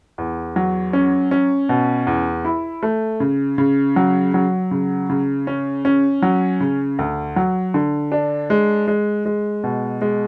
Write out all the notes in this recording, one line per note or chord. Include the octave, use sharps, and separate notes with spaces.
E2
F#3
C#4
C#4
B2
E2
E4
A3
C#3
C#3
F#3
F#3
C#3
C#3
C#4
C#4
F#3
C#3
D2
F#3
D3
D4
G#3
G#3
G#3
B2
G#3